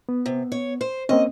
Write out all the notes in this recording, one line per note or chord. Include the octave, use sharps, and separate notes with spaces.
B3
C3
C#5
C5
A#3 C4 C#4 D#5